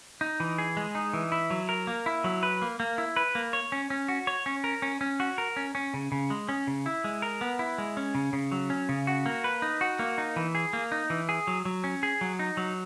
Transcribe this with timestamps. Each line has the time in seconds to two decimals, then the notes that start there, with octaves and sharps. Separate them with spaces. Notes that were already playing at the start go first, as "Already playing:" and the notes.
0.21 D#4
0.40 E3
0.58 G#4
0.77 G#3
0.95 D#4
1.13 E3
1.32 E4
1.50 F#3
1.69 A#4
1.87 A#3
2.06 E4
2.24 F#3
2.43 B4
2.62 A#3
2.80 A#3
2.98 E4
3.16 B4
3.35 A#3
3.53 C#5
3.72 C#4
3.90 C#4
4.08 F#4
4.27 C#5
4.46 C#4
4.64 A#4
4.82 C#4
5.01 C#4
5.20 F#4
5.38 A#4
5.56 C#4
5.75 C#4
5.94 C#3
6.12 C#3
6.30 G#3
6.49 C#4
6.67 C#3
6.86 E4
7.04 G#3
7.22 A#4
7.41 B3
7.59 E4
7.78 G#3
7.97 C#4
8.15 C#3
8.33 C#3
8.52 F#3
8.70 C#4
8.89 C#3
9.07 F#4
9.26 A#3
9.44 B4
9.62 D#4
9.81 F#4
9.99 A#3
10.18 D#4
10.36 E3
10.55 G#4
10.73 A#3
10.92 D#4
11.10 E3
11.29 G#4
11.47 F#3
11.65 F#3
11.84 C#4
12.03 G#4
12.21 F#3
12.39 D#4
12.57 F#3